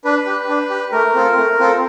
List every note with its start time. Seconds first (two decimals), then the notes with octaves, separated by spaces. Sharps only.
0.05 D4 B4
0.26 G4
0.49 D4
0.70 G4
0.92 A3 A#4
1.15 C4 F4 A4
1.37 A3
1.59 C4 F4 A4